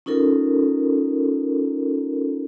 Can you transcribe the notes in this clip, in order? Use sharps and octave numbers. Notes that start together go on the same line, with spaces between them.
C#4 D#4 F4 A4 A#4